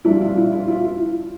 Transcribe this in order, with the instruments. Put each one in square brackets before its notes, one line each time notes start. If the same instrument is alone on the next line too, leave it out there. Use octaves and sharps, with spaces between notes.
[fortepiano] F2 E3 G3 D4 E4
F4
E4
F4
E4
F4
E4
F4
E4
F4
E4